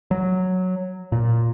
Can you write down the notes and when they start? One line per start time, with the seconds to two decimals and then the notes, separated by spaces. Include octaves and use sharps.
0.11 F#3
1.12 A#2